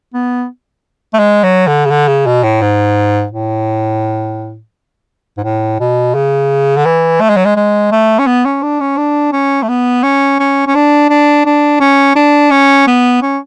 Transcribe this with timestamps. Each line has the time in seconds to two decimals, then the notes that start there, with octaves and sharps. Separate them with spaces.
0.14 B3
1.14 A3
1.19 G#3
1.44 F#3
1.67 D3
1.86 C#3
1.90 D3
2.08 C#3
2.27 B2
2.43 A2
2.62 G#2
3.32 A2
5.38 G#2
5.44 A2
5.80 B2
6.15 C#3
6.77 D3
6.86 E3
7.21 A3
7.29 G#3
7.37 F#3
7.46 G#3
7.56 G#3
7.92 A3
8.19 C#4
8.27 B3
8.45 C#4
8.63 D4
8.81 C#4
8.97 D4
9.33 C#4
9.63 A3
9.69 B3
10.03 C#4
10.39 C#4
10.67 C#4
10.75 D4
11.10 D4
11.46 D4
11.80 C#4
12.16 D4
12.51 C#4
12.87 B3
13.22 C#4